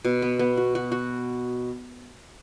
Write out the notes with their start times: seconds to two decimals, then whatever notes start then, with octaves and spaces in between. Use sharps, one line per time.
0.05 B2
0.22 B3
0.39 B3
0.57 F#4
0.75 F#4
0.92 F#4